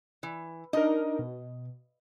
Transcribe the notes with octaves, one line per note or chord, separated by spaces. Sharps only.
E3
D4 D#4 A#4 D#5
B2